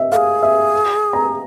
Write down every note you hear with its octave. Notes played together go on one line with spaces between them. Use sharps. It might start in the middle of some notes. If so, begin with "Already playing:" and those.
Already playing: D#5 E5
G#4 A4 F5
E5
A#5